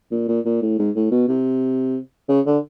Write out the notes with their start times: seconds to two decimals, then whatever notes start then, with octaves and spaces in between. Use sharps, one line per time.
0.11 A#2
0.28 A#2
0.45 A#2
0.62 A2
0.79 G#2
0.95 A2
1.11 B2
1.28 C3
2.28 C#3
2.46 D3